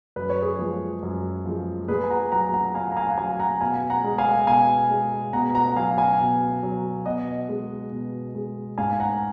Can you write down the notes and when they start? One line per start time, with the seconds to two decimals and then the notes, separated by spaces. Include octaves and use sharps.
0.16 F#2 B4
0.30 C#5
0.42 G#4 B4
0.59 F3 G#3
1.03 F#2
1.45 F3 G#3
1.88 A#2 G#4 B4
2.04 G#5
2.10 F#5 A#5
2.32 F#3 F#5 A#5
2.54 F#5 A#5
2.75 A#2 F5 G#5
2.92 A#5
2.97 F5 G#5
3.11 F#5
3.18 F#3 F5 G#5
3.40 F#5 A#5
3.61 B2 F5 G#5
3.90 F#5 A#5
4.04 G#3
4.18 F5 G#5
4.47 B2 F5 G#5
4.91 G#3
5.33 B2 F#5 A#5
5.55 F#5 A#5
5.67 F#5
5.76 F#3 F5 G#5
5.98 F5 G#5
6.20 B2
6.63 F#3
7.06 B2 D#5 F#5
7.49 G#3
7.92 B2
8.35 G#3
8.78 G#2 F5 G#5
9.00 F#5 A#5